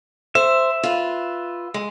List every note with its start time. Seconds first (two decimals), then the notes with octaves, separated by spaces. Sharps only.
0.35 C5 E5
0.83 F4 B4
1.74 G#3